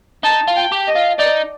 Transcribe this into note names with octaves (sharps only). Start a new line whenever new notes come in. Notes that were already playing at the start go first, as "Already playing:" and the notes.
D#4 A5
F4
G5
G4
D#5
F4
D#4 D5